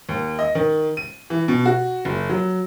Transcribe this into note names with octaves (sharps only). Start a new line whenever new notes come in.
D#2
D#5
D#3
D#7
E3
B2
F#4
F#1
F#3